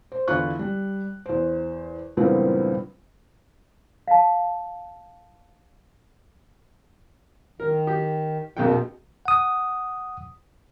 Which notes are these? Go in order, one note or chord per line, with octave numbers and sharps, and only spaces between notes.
C5
E2 D3 E4 F4 C#6 F#6
G3
E2 C5
C#2 G2 A#2 E3 B3 C4
F5 A5
D#3 A#4
G4
A#1 F2 B2 G5
F#5 D#6